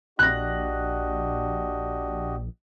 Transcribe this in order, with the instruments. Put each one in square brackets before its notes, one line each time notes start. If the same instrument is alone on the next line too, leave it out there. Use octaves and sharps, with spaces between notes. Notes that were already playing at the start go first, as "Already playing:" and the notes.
[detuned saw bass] A#1 [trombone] D4 [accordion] F#4 G4 D#5 [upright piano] F#6 A#6